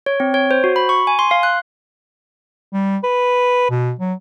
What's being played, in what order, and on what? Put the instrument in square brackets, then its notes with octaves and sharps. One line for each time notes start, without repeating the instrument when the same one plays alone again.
[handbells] C#5
C4
C#5
C5
F#4
B5
C#6
G#5
C6
F5
F#6
[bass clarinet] G3
B4
B2
F#3